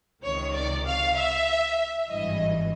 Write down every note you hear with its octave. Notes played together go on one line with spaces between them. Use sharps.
C#2 C3 D#3 C#5
D5
F5
E5
G#1 G2 E3 D#5